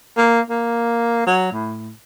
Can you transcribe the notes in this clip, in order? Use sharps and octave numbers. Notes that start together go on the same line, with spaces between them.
A#3
A#3
F#3
A2